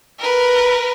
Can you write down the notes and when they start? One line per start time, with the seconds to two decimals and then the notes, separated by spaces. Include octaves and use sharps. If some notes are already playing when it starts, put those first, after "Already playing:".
0.19 A#4 B4